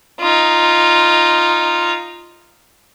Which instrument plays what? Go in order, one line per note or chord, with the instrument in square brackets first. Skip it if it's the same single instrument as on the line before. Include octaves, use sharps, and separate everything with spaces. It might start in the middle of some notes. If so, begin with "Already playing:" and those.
[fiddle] D#4 F4